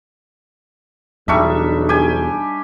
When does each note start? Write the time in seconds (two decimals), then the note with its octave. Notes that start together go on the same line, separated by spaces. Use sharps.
1.28 B1 E2 G3 D4 D#4 E5 C#6
1.89 D4 G4 G#5